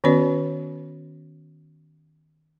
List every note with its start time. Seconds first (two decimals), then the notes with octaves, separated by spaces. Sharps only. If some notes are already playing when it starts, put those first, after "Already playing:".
0.04 D#3 B3 C#4 F#4 B4 D5